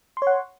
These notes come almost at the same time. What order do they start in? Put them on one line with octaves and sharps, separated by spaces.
C6 C#5 F#5